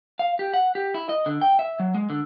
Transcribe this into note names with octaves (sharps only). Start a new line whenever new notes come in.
F5
G4
F#5
G4
E4
D#5
D3
G5
E5
F#3
G#3
D3